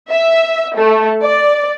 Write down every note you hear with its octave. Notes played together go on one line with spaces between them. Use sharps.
E5
A3
D5